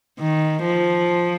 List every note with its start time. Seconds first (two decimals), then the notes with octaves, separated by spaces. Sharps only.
0.19 D#3
0.64 F3